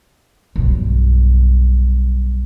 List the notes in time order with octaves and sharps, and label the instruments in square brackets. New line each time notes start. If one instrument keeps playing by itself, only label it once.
[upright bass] B1 G2